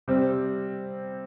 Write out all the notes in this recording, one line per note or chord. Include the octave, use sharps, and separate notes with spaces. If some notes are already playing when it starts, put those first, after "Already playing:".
C3 G3 C4